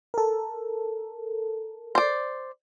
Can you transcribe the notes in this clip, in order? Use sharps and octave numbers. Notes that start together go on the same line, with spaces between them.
A4 A#4
C5 D5